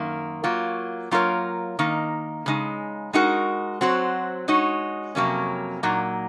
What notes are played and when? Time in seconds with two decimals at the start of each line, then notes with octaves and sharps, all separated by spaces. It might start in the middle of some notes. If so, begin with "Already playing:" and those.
Already playing: F#2 D#3 A#3
0.44 F#3 A#3 F4
1.11 F#3 A#3 F4 A#4 C#5
1.79 D#3 A#3 D#4
2.46 C#3 G#3 D#4
3.13 G#3 D#4 F#4 A#4
3.81 F#3 C4 F#4 C5
4.48 G#3 D#4 F#4 C#5
5.15 F2 C3 F#3 A#3 C#4
5.83 A#2 F#3 A#3 D#4